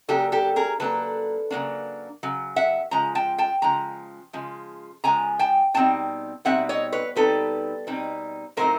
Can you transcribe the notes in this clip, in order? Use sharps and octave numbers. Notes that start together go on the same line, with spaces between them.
C#3 F#3 A#3 D4 G4 A4
G4 A4
G#4 A#4
C#3 F#3 A#3 D4 A4 B4
C#3 F#3 A#3 D4
C#3 F#3
E5 F#5
C#3 F3 G#3 A#5
G5 A5
G5 A5
C#3 F3 G#3 A#5
C#3 F3 G#3
C#3 F3 G#3 G#5 A#5
G5 A5
B2 G3 C4 D#4 G5 A5
B2 G3 C4 D#4 E5 F#5
C#5 D#5
B4 C#5
B2 G3 C4 D#4 A4 B4
B2 G3 C4 D#4
A2 F#3 A3 C4 D#4 A#4 C5